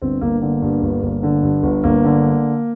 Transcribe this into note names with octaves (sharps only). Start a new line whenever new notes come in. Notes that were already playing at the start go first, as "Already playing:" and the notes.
G1 C4
G1 A#3
D3 A#3
G2
G1
G1
D3
G2
G1
G1 A#3
D3